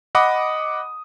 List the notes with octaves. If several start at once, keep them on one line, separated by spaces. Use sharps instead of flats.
D#5 F#5 B5 D6 D#6